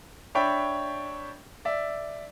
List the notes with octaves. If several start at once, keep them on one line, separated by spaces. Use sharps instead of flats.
D4 C#5 E5 G5 B5
D5 E5